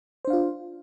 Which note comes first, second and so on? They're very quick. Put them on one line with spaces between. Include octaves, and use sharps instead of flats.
C5 D4 F5 F4